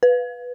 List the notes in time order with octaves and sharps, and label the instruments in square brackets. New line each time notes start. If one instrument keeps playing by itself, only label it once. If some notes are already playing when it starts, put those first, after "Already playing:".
[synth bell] B4